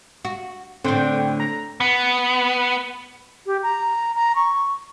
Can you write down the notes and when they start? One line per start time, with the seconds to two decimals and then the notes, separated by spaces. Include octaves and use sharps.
0.25 F#4
0.84 A2 D3 C4 C5 G5
1.40 A#5
1.80 B3
3.46 G4
3.63 A#5
4.16 A#5
4.36 C#6